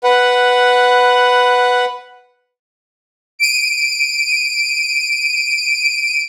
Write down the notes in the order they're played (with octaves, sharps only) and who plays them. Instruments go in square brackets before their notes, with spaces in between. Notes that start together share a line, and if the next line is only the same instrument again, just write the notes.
[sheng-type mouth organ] B4 F#5
[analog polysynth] D7 D#7